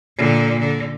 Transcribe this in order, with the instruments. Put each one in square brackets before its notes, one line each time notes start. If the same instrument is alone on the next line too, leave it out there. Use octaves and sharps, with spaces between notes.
[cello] A#2 D3
D3